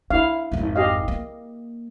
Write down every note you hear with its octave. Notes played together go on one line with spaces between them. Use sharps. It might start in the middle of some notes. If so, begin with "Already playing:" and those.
D4 E4 F5
G#1 F2
G4 D#5 F5
A#3